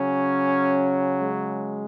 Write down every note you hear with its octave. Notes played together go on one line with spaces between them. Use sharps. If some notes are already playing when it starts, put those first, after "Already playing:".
Already playing: C#3 F#3 C#4
G#3